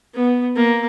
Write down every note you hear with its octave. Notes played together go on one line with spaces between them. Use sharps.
B3
A#3